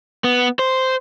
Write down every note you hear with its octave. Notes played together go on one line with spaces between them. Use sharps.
B3
C5